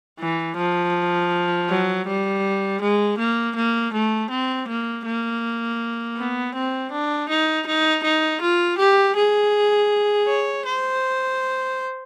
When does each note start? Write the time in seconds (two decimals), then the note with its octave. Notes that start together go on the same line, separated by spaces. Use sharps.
0.20 E3
0.57 F3
1.69 F#3
2.07 G3
2.81 G#3
3.18 A#3
3.56 A#3
3.93 A3
4.30 C4
4.68 A#3
5.05 A#3
6.17 B3
6.55 C4
6.92 D4
7.29 D#4
7.67 D#4
8.04 D#4
8.41 F4
8.78 G4
9.16 G#4
10.28 C#5
10.65 C5